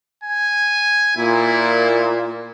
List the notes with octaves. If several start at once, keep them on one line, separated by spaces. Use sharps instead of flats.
G#5
A#2 E4